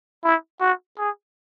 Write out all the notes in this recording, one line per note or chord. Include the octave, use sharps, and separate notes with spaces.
E4
F#4
G#4